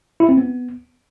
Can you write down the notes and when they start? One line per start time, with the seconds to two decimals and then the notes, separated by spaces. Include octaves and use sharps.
0.20 E4
0.29 C4
0.37 B3